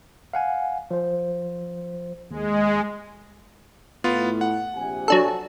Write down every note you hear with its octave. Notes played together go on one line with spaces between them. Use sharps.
F5 F#5 G#5
F3 C5
D#2 G#3
A2 B3 F4
F#5
A#1 C3 G#5
F#3 D4 A4